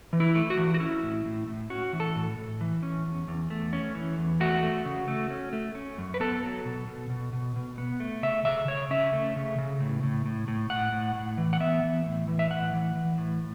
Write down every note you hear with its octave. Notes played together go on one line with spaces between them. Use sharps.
E3
E4
A3
F#4
E3
F#4
C#4 E4
A2
A2
A2
C#4 F#4
E3
A4
A2
A2
E3
C#4
E2
E2
A3
C#4
E3
E2
A3 F#4
A3
C#3
A3
C#4
A3
C#4
F#2
B4
B3 A4
F#3
B2
B2
B2
B2
B2
B3
A3
C#3 E5
C#3 E5
C#3 C#5
C#4 E5
A3
C#3
C#3
A2
A2
A2
A2
A2 F#5
A2
A2
E3
F#5
B3 E5
E3
A2
E3
E5
A2 F#5
E3
E3
A2